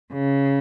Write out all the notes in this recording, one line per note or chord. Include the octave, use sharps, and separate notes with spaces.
C#3